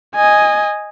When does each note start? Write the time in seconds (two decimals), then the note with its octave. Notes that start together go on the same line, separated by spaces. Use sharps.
0.15 D#5 G#5